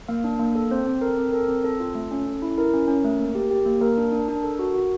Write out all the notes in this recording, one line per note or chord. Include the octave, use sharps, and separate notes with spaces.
A#3 F5
D4
A#3
A4
C4 C5
C4
A4 A#4
C4
A4 A#4
C4
C4 A4
F4
A3
C#4
C#4
E4
E4 A#4
C#4
C#4
A3
A#3
G4
G4
A#3
A#3 A#4
D4
D4
D4
A4
F#4
F#4